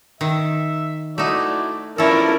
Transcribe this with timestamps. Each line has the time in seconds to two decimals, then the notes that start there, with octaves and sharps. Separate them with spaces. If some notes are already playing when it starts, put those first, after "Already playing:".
0.21 D#3 E5
1.18 A3 D#4 E4 F#4 D5
1.98 E3 F3 C#4 D4 E4 A4 A#4